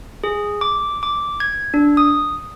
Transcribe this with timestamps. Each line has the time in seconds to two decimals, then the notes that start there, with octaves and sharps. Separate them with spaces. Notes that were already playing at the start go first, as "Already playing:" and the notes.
0.24 G#4
0.61 D6
1.03 D6
1.40 G#6
1.74 D4
1.97 D#6